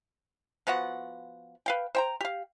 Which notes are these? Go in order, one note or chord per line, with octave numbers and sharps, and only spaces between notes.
F3 B3 F#4 F#5
B4 F5 G5
C5 G5 A#5
G4 F5